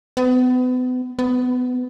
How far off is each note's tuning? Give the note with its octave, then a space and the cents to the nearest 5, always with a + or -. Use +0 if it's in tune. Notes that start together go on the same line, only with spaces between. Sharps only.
B3 +35
B3 +20